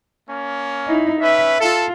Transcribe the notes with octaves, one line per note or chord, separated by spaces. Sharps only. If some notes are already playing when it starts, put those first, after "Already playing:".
A#3 C#4
D#4 E4
C#4 B4 E5
F4 A4